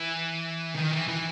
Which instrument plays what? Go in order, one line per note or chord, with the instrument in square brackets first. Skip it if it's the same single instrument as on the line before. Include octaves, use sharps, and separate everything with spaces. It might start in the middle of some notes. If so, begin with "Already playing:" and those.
Already playing: [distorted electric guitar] E3
D#3
E3
E3